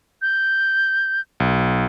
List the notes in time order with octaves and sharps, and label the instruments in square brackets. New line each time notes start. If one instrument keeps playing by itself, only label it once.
[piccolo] G6
[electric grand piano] B1